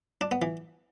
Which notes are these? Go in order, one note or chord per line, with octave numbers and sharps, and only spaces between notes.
D4
B3
E3